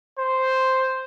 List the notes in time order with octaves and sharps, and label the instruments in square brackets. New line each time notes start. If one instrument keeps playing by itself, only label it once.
[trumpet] C5